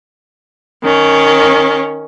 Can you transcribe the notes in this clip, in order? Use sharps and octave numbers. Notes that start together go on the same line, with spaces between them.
D#3 C#4